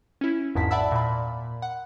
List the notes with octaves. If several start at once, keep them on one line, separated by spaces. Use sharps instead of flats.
C#4 E4
G#1 E2 G#2 E4 A5 B6
D5 E5 F#5 A5 B5 E6
A#2 B5
F#5